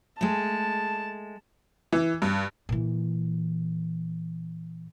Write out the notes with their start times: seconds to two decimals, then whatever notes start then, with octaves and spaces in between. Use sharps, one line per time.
0.21 G#3 A3 A5
1.93 E3
2.22 G2
2.69 A#2 E3